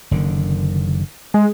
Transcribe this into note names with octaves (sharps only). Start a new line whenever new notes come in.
F#1 D3 D#3
G#3